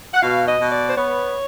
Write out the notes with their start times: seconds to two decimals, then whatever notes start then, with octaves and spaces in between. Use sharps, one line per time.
0.14 F#5
0.22 B2 F5
0.48 D#5
0.60 B2
0.72 D5
0.88 C5
0.97 B3 C#5